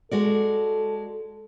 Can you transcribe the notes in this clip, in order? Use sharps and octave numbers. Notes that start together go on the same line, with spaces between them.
G#3 F#4 A4 D5